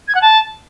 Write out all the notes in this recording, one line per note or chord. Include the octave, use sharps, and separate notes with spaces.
G#6
F#5
A5